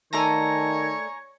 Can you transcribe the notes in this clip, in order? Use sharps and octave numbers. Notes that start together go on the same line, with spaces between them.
D#3 A3 A4 C#5 D5 G#5 A#5 A#6